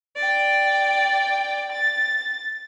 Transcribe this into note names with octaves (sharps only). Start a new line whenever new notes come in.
D5 G5
A6